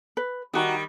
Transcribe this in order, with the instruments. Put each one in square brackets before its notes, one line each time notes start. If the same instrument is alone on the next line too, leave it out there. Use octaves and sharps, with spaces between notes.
[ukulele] B4
[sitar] D#3 G3 [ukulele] D#4 F#4 A#5